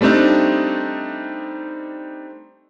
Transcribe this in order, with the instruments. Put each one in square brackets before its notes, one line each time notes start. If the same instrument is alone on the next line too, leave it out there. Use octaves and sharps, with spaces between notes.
[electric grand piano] G3 A3 C4 D4 D#4